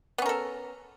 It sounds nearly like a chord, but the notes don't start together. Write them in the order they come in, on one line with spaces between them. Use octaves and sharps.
B3 C#4 A#4 A4